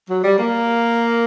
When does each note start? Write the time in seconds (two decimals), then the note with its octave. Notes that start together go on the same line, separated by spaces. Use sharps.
0.08 F#3
0.24 G3
0.39 A#3